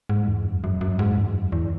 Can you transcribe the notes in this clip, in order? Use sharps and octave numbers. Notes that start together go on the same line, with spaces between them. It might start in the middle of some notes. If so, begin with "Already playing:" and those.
G#2
E2
F#2
F#2
F#2
G#2
E2
F#2
E2